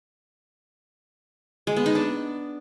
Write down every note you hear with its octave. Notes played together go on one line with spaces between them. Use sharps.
G#3
B3
D#4
D4